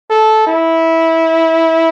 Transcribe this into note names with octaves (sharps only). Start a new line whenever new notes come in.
A4
E4